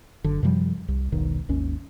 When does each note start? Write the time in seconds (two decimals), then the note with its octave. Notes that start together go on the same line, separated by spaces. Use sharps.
0.24 F#1 D3
0.43 F#2 C3 F3 G3
0.88 C2
1.12 E1 B1 D#3
1.49 G#1 D#2 C#4